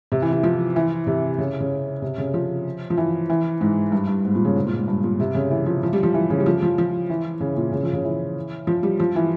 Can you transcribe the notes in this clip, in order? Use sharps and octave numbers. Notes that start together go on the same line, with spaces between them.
C3
E3
E3
F3
E3
C3
C#3
C#3
C3
C#3
F3
F3
E3
E3
G#2
G2
G2
G#2
A#2
C#3
G#2
A#2
G#2
G2
A#2
C3
C#3
E3
F3
F3
G3
F3
E3
C#3
G3
F3
F3
F3
E3
C#3
A#2
C#3
F3
C#3
E3
F3
G3
F3
E3